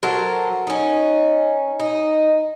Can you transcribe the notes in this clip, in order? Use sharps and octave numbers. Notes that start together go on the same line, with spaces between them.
F#3 A4 A#4 C5
C#4 D#4
D#4